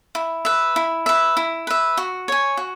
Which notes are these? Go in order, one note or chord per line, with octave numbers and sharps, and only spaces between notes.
E4
B4 E5
E4
B4 E5
E4
B4 E5
F#4
C#5 G#5
F#4